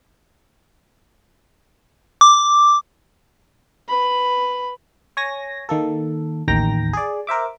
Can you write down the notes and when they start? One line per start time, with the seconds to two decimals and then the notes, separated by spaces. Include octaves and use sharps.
2.21 D6
3.89 B4 B5
5.17 C#5 G#5 A#6
5.69 D#3 A#3 A4
6.48 A1 D#2 D#3 G5 A#5 A#6
6.93 G#4 D5
7.27 A#4 C5 E5 D6